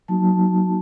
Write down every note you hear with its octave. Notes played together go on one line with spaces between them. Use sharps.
F#3 A#3 D#4 F#4 A5
F#3